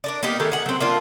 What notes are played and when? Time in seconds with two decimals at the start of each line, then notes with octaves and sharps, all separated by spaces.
0.04 D4 A#4 D5
0.23 A#3 B3 D#4 G4
0.40 D#3 A3 G#4
0.52 G#4 F#5
0.66 F#3 C4
0.80 A#3 D4 F4